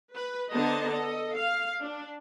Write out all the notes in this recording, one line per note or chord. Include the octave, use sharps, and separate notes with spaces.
B4
D3 B3 C5 D#5 A5 A#5
A4 D#5
F5
D4